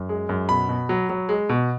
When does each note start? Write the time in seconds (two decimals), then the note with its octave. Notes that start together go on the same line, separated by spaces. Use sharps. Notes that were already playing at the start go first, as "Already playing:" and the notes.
Already playing: F#2
0.09 G#3
0.29 F#2
0.49 B2 B5
0.69 B2
0.89 F#3
1.09 F#3
1.29 G#3
1.49 B2